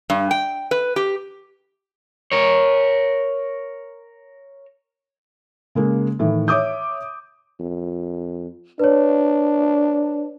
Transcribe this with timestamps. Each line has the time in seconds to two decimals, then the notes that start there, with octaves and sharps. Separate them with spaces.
0.10 G2
0.31 G5
0.71 B4
0.96 G4
2.32 A#4 C#5
5.75 C#3 G#3 A#3
6.19 A2 D#3 E3
6.48 C#5 E5 D6 D#6 G6
7.60 F2
8.79 D4 B4 C#5